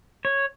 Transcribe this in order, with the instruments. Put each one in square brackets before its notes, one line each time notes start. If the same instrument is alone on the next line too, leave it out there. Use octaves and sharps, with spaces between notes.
[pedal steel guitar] C#5